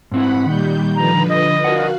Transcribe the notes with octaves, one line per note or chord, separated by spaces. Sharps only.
G#2 C4 E4 F#5 B5
A#2 D#3 G3 G6
D3 F3 B4 A#5
D#5
F#4 A#4 D5 F5 F#5 F#6